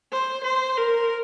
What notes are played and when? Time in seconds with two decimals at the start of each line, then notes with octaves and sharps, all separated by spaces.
0.12 C5
0.44 C5
0.77 A#4